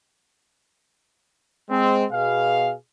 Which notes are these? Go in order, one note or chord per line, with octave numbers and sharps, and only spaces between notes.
G#3 C4
B2 G#4 F5